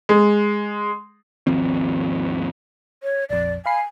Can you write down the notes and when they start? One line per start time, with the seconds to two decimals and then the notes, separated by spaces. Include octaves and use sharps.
0.09 G#3
1.47 G#1 D#2 F3 C4
3.03 C#5
3.30 A#1 F2 D5
3.66 F5 G#5 B5 C7